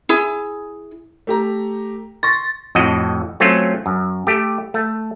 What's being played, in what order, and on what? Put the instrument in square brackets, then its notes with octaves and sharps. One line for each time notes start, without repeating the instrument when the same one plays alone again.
[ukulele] E4 G#4
[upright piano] A3 G4 A#5
[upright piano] C6 C#6 A#6 [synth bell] A6
[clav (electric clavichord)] F2 A2 F#4 D#5
F#3 A3 C4 C#4 F4
F#2
A3 G4
A3